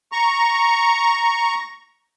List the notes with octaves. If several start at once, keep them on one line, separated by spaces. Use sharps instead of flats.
A#5 C#6